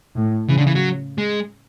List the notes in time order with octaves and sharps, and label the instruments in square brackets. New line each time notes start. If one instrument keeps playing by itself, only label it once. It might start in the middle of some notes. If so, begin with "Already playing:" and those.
[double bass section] A2
[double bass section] C#3 [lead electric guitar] E3
[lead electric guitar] D3
E3
F#3
G#3